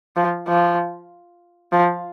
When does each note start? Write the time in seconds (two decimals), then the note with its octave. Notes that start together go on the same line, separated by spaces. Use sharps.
0.16 F3
0.48 F3
1.72 F3